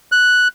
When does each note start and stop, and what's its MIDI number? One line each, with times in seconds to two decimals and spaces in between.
0.12 0.48 90